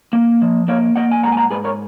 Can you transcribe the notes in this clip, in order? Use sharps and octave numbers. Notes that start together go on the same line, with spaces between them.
A#3
F3
A#3 C#5 F5
A#3 D#5 F#5
G#5
G#2 F#5 A#5
G#5
F#5 A#5
G#2 G#4 B4
A#4 C#5